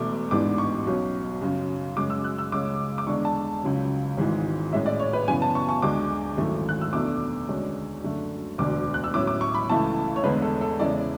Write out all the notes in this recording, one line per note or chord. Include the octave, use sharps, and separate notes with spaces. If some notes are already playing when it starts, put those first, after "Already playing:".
Already playing: E1 E2 B2 A3 D6
A1 G#2 E3 B3 D4 D6
C#6
B1 B2 F#3 C#4
F#2 C#3 F#3 C#4
F#2 C#3 G#3 C#4 D6
E6
F#6
E6
C#2 C#3 G#3 C#4 D6
D6
E2 D3 G#3 D4 C#6
A5
C#2 C#3 F#3 C#4
G#1 G#2 E3 G#3
A2 G#3 C#4 E5
D5
C#5
B4
F#2 C#3 E3 B3 G#5
A5
C#6
C#6
D2 D3 G#3 D6
G#1 F#2 E3 A3
F#6
E6
E2 B2 A3 D4 D6
D2 D3 G#3 C#4
F#2 D3 A3
E1 D2 D3 D6
F#6
E6
A2 F#3 C#4 E4 D6
D6
C#6
B5
C#2 C#3 E3 A3 E4 A5
C#5
E2 D3 G#3 D4 B4
A4
A4
E2 C#3 G#3 C#4 E4 D5